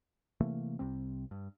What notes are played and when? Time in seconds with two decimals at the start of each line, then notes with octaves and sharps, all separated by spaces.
0.40 C3 E3 A3 A#3
0.79 C2 C3 G3 C4
1.31 G2